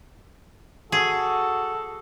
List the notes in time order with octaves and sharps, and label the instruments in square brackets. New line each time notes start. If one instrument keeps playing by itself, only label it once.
[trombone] F#4 [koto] G#4 [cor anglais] A4